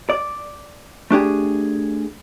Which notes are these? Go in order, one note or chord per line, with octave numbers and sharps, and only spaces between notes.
D5
A3 D4 G4 G#4